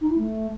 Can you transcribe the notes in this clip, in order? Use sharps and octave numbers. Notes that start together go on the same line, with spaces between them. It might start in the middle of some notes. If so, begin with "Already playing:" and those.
D#4
E4
A3